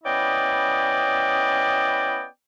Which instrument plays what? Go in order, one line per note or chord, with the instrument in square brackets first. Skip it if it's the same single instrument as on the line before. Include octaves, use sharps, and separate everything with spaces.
[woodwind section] B3 C#4 E4 D5 D#5 G5